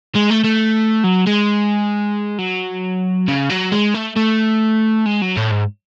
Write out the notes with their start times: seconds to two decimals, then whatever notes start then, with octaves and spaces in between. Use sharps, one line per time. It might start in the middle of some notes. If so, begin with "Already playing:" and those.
0.15 G#3
0.30 A3
0.44 A3
1.04 F#3
1.27 G#3
2.38 F#3
3.28 C#3
3.50 F#3
3.72 G#3
3.95 A3
4.16 A3
5.06 G#3
5.22 F#3
5.37 A2
5.51 G#2